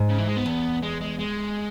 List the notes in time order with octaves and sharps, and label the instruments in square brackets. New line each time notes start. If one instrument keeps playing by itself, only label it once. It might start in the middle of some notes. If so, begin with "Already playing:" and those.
Already playing: [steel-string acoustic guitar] G#2
[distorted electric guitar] C#3
E3
G#3
B3
[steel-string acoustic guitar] E2
[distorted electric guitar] G#3
G#3
G#3